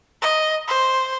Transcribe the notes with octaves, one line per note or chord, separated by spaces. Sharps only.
D#5
C5